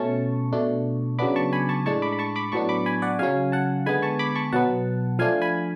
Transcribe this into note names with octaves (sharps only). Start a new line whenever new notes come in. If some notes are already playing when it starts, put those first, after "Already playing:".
Already playing: B2 A3 C#4 A5 C#6
B2 A3 D4
C#3 F#3 B3 D4 B5 D6
A5 C#6
G#5 B5
A5 C#6
A2 G#3 D4 A5 C#6
B5 D6
B5
A5 C#6
B5 D6
A2 F#3 B3 D4 A5 C#6
B5 D6
G#5 B5
D5 F#5
C#3 F#3 C#4 F5 G#5
F#5 A5
D3 G#3 B3 G#5 B5
A5 C#6
B5 D6
A5 C#6
B2 F#3 B3 F#5 A5
F3 A3 D4 F5 G#5
G#5 B5